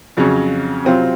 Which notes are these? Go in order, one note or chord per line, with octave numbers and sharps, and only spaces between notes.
F2 C#3 F#3 C#4
C3 F#3 C4 F4